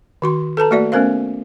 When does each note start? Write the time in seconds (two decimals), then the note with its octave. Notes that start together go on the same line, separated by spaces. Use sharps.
0.22 D#3 F#4 C6
0.57 A4 B4 A5 A#5
0.71 A3 A#3 F#4 D5 E5
0.92 A3 B3 C#4 A#4 C5 F5